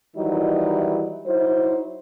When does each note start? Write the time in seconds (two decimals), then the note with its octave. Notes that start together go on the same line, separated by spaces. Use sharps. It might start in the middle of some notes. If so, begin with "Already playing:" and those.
0.16 D#3 E3 F#3 G3 D#4 E4
1.26 F#3 D#4 E4 C5